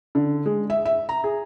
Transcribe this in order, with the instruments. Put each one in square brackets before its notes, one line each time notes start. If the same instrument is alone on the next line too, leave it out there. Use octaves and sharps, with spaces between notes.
[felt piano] D3
G#3
E5
E5
A#5
G#4